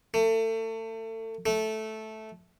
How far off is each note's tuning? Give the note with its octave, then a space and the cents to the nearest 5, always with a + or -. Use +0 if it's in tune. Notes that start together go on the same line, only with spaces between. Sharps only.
A3 +30
A3 -10